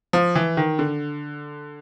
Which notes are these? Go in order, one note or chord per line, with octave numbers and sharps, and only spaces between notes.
F3
E3
D#3
D3